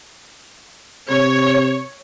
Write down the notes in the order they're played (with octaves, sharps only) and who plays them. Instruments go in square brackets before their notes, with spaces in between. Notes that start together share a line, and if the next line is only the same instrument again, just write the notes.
[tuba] C3 [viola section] C#5